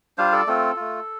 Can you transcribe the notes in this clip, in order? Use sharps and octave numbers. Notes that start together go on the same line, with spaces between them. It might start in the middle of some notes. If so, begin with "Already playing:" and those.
G3 D4 F4 C5 F5
A4 D5
A3 C4 F4 A4
A3 F4